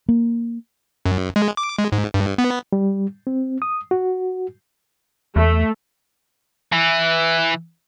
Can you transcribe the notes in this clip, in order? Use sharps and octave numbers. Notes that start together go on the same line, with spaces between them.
A#3
F#2
G#3
D6
G#3
G#2
G2
B3
G3
C4
D#6
F#4
E2 A3
E3